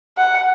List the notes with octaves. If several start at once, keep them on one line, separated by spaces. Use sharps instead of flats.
F#5